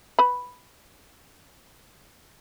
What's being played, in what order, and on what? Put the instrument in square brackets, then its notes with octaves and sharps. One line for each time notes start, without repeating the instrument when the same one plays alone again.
[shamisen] B4 B5